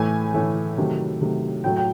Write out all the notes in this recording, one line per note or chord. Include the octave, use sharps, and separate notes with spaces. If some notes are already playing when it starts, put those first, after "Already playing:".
Already playing: A2 E3 A3 G#5
A2 E3 A3
C3 D#3 F#3 A3
C3 D#3 F#3 A3
A2 F#3 A3 G5
G5